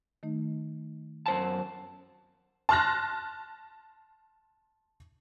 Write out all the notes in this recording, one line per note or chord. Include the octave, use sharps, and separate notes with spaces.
D#3 A3 D#4
F#2 C5 A5
A5 C6 F6 F#6 A#6